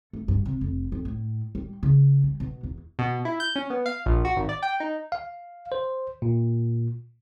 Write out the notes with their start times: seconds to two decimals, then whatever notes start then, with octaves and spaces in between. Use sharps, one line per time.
0.13 A3
0.28 G2
0.45 C3
0.61 F1
0.92 F2
1.05 A2
1.55 G3
1.83 C#3
2.24 G3
2.40 B2
2.63 E2
2.99 B2
3.25 E4
3.40 G6
3.56 C#4
3.70 B3
3.86 F5
4.06 A#1
4.25 F#4
4.36 G#1
4.49 D5
4.63 G5
4.80 D#4
5.12 F5
5.72 C5
6.22 A#2